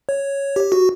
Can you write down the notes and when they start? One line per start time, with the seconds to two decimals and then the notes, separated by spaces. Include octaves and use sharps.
0.09 C#5
0.56 G4
0.72 F#4